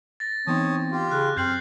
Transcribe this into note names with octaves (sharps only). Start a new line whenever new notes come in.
A6 A#6
E3 B3 C4 D#4 C#5 A5 D#6
F4 G4
C#3 F6 F#6
F#2 C4 F6 G6 C7 F#7